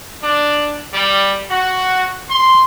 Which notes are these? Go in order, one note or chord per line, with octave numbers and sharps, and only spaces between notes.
D4
G3
F#4
C6